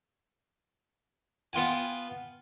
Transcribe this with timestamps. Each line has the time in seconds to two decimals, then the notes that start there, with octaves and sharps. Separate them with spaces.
1.53 B3 F4 G5 G#5